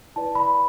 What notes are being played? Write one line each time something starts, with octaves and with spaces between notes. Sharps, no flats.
E4 B4 D5 A5
B5